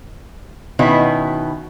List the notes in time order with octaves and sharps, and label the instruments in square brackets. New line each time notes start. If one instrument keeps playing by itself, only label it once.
[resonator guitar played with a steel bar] B2 D#3 C#4 E4 F#4 B4